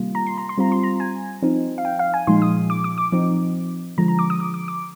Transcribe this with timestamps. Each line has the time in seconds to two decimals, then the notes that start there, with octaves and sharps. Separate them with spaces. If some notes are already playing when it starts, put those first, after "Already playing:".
Already playing: C3 D#3 G3 A#3 F4
0.15 A#5
0.27 C6
0.38 A#5
0.49 C6
0.58 G3 C4 F4 A#5
0.72 C6
0.83 A#5
1.00 G#5
1.42 F3 C4 D#4
1.78 F5
1.85 G5
1.99 F5
2.14 G#5
2.27 A#2 F3 G#3 D#4 C6
2.42 D#6
2.70 D6
2.84 D6
2.98 D6
3.12 F3 C4 D#4
3.98 D3 F3 G#3 A#5
4.08 A#5
4.19 D6
4.30 D#6
4.40 D6
4.54 D6
4.68 D6